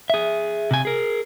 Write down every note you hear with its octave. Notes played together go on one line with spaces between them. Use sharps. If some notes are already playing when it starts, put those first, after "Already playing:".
G#4 E5
C3 G#5
G#4 A#4